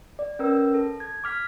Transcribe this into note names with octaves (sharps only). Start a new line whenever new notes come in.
D5
C#4 A#4 B4 E6
A4
G#6
D6 F6 B6